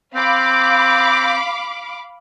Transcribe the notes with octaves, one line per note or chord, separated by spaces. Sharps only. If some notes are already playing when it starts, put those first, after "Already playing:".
C4 F5 B5 D6